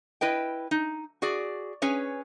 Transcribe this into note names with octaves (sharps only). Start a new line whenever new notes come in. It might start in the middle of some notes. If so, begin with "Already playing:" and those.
E4 B4 D#5 G5
D#4
F#4 G#4 D5
C#4 G#4 B4 C#5